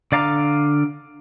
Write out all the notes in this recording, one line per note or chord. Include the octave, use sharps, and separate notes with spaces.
D3 D5 F5 A#5